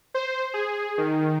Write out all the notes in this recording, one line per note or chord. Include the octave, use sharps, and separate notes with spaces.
C5
G#4
D#3